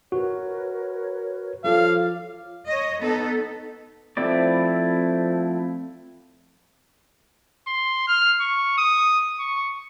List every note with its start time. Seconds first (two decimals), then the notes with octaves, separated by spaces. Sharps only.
0.12 F#4 A#4 B4 C#5
1.64 F3 A4 C#5 F5 D6
2.68 C#5 D#5
3.01 B3 D#4 A4
4.17 F3 A3 C4 E4 D5
7.68 C6
8.08 F6
8.40 C#6
8.78 D#6
9.39 C#6